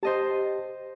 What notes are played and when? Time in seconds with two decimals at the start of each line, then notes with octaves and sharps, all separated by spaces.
0.03 G4 C5 D#5 A5